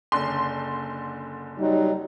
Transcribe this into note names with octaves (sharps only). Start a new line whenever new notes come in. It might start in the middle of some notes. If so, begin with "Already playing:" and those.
F#1 D3 C6
F#3 G3 D#4